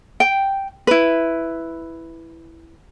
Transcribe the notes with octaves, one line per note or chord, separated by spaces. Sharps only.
G5
E4 B4